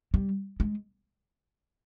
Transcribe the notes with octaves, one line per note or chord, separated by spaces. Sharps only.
G3
G#3